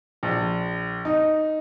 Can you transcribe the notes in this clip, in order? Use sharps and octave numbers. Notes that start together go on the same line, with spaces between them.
A#1
D#4